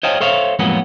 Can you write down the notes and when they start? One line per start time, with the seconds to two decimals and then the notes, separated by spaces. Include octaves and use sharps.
0.03 C5 C#5 D#5 F5 G5 A5
0.21 A4 C5 C#5 E5 F5
0.59 F2 A2 F#3 G#3 A#3 B3